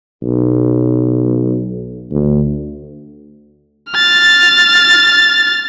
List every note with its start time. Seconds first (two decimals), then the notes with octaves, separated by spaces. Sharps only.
0.22 B1
2.11 D2
3.91 F6 A6